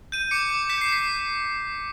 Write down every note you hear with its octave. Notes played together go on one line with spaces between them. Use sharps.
G6 D#7
D6 C#7
D6
G6 B6
C7
G6 B6